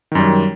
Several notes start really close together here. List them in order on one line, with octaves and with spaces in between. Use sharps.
D#3 F#2 G3